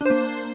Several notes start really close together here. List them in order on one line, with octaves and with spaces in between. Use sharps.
D4 C5 A#3